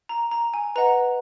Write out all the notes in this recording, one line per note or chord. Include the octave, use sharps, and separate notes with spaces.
A#5
A#5
G#5
B4 D#5 F#5 A#5